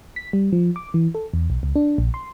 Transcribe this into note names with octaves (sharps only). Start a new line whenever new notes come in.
B6
G3
F3
D6
E3
A4
E2
B1
C#2
D4
A#1
C6